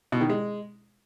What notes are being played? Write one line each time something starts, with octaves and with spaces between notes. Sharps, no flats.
B2
D#3
G#3